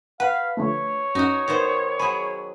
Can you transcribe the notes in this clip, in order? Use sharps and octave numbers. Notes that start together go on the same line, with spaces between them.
B4 F5 F#5
D3 F3 A3 C#5
F#2 D#4 F#4
D#3 B3 C5
F#3 G#4 B5